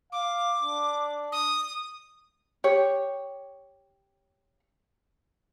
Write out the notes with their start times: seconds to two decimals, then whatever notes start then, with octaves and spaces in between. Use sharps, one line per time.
0.12 F5 D6
0.63 D4
1.32 D#6
2.64 G4 C#5